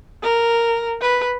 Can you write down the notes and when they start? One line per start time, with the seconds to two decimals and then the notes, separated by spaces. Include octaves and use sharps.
0.23 A#4
1.01 B4